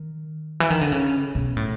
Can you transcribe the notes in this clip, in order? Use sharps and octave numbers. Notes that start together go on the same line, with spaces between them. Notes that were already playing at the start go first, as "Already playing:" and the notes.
Already playing: D#3
E3
D#3
D3
C#3
B2
A2